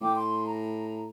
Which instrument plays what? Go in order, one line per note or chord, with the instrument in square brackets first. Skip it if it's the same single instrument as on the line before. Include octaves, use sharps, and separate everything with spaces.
[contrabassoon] A2 [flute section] G5 D6
[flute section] C6
A#5